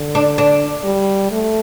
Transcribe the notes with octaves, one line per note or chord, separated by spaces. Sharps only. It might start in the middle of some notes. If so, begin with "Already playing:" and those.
Already playing: D3
D4
D4
G3
A3